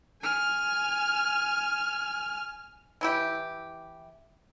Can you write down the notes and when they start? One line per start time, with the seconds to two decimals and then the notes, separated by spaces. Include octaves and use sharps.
0.22 G#5 F6
3.01 E3 E4 G4